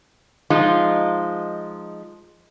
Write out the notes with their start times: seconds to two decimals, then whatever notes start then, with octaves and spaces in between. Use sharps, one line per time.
0.50 F3 G#3 D#4 F4